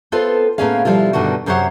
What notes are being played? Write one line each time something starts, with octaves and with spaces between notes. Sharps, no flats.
B3 C4 F4 A4 B4 C5
A2 A#3 B3 C#4 G#4 F5
B2 F3 G3 E4 F4
G2 B2 D3 D#3 F#4
F#2 C3 F#3 C5 C#5 F#5